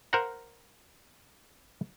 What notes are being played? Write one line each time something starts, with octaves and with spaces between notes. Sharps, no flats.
A#4 C5 F5 F#5 A#5